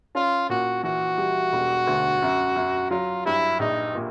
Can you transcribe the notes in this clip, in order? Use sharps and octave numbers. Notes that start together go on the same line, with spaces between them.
C#4 F4
A#2 F#4
E3 F#4
G3
E1
D2
F#2
F#2
F#3 F4
G2 E4
A#1 D#4
A#2